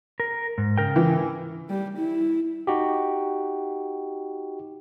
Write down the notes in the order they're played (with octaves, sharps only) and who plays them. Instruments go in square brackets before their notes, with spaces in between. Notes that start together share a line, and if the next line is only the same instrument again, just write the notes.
[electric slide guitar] A#4
G#2
C#3 A#4 G5
[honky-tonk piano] E3
[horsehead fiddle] G3
E4
[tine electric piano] D#4 F#4 G4